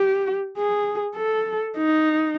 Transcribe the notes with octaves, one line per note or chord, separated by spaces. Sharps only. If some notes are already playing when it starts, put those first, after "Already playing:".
Already playing: G4
G#4
A4
D#4